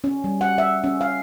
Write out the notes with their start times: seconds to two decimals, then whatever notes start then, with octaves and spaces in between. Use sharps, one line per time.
0.04 C#4
0.24 G3
0.41 F#5
0.58 E5
0.84 C#4
1.01 F5